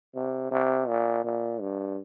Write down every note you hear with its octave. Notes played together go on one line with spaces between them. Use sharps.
C3
C3
A#2
A#2
G2